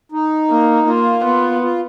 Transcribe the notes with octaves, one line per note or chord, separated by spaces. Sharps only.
D#4
A#3
A#3 F4
B3
F4